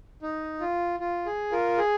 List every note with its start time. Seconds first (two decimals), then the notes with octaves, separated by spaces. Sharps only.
0.22 D#4
0.60 F4
1.00 F4
1.26 G#4
1.52 F4 A#4
1.78 G#4